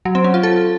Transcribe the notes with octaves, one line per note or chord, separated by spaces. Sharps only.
F#3
C4
C#4
F4
A4